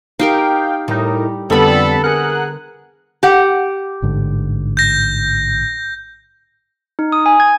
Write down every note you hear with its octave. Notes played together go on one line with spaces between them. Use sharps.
D#4 G4 A#4 F5 G5
A2 G3 D#4 A#4
F2 D3 G3 B3 A4 B5
G#4 A#4 F#5 F#6
G4 F#5
A1 G#2 D3
G6 A#6
D#4
D#6
G#5
G#6